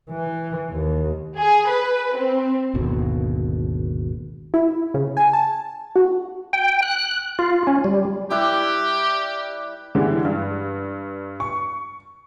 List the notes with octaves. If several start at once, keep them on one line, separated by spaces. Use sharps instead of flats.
E3
D#2
G#4
B4
C4
G#1 D#2 B2 D3
E4
C#3
G#5
A5
F#4
G5
F#6
F4
C#4
G3
G3 E4 G4 B4
D3 E3 G3 G#3
G2
C#6